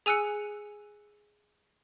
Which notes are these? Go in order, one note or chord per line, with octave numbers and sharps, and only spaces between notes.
G#4 G#5 E6 F#6 C#7